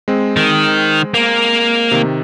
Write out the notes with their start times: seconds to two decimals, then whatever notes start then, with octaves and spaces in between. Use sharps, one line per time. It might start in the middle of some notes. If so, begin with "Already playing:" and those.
0.08 G#3 C4
0.36 D#3
1.14 A#3
1.91 C3 D#3